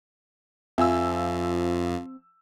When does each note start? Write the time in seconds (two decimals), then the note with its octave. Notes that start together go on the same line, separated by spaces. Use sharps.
0.78 F2 F3 C4 E5 G#5 E6